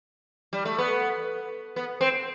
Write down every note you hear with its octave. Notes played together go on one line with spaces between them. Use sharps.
G3
A3
B3
B3
C4